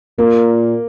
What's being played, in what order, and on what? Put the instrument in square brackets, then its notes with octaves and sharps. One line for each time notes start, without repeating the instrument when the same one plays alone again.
[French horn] A#2 [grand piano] A#3